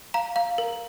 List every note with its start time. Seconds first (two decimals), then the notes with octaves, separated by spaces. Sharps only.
0.14 F5 A#5
0.36 F5
0.58 A#4